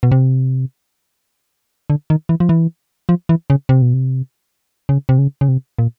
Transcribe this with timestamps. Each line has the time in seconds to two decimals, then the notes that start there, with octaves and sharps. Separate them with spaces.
0.03 B2
0.12 C3
1.90 D3
2.10 D#3
2.29 E3
2.40 F3
2.49 E3
3.09 F3
3.29 E3
3.50 C#3
3.69 C3
3.82 B2
3.94 C3
4.89 C#3
5.09 C3
5.18 C#3
5.41 C#3
5.48 C3
5.79 A#2